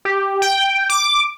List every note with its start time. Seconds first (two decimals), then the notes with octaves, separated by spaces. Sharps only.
0.05 G4
0.42 G5
0.89 D6